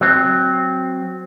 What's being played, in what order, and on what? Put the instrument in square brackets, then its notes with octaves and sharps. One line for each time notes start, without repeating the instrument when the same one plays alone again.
[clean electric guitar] F#3 C4